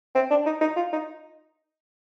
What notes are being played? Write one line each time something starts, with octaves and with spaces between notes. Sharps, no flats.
C4
D4
D#4
D#4
F4
D#4